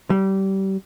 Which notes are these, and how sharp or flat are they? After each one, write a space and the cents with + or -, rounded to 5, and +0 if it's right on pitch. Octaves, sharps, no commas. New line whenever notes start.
G3 -25